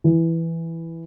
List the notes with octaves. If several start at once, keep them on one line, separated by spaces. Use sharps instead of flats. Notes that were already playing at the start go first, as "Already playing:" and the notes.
E3